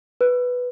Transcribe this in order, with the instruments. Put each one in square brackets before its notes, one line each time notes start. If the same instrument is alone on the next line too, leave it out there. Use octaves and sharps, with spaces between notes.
[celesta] B4